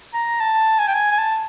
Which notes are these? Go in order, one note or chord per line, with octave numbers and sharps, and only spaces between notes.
A#5
A5
G#5
G5
G#5
G#5
A5